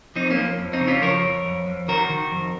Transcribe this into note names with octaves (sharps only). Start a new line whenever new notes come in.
F3 C4 D#4
A#3 C#4
F3
F2
C4 D#4
C#3
C#4 F4
F3 A#4 C#5
F2
F2
F2
D#3 F#4 A#4
D#3
F2